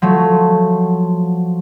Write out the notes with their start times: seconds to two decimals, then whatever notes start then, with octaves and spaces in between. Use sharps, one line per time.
0.02 F3 F#3 A3